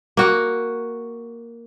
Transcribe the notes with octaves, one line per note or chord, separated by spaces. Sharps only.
A#3 F#4